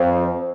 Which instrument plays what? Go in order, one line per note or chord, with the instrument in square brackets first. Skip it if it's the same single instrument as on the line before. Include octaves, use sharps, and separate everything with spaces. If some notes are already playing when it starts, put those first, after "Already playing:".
Already playing: [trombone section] F2 [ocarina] C5